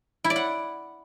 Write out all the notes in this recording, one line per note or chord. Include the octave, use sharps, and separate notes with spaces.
E4
D5
F#5